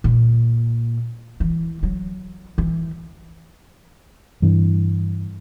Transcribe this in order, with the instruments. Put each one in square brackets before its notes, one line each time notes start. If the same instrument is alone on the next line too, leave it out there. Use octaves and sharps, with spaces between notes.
[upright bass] A#2
E3
F#3
E3
[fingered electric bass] G2 E3